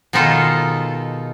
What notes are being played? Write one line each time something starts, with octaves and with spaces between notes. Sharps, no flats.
B2 D#3 G#3 D#4 F4 A4